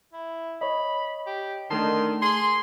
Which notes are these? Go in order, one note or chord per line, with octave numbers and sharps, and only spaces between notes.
E4
C#5 D#5 B5
G4
D3 D#3 A3 A5 C6
G#4 C6